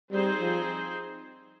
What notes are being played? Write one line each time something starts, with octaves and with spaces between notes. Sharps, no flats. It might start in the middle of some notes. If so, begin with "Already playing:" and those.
G3 C4 D#4 G#4 C5
F3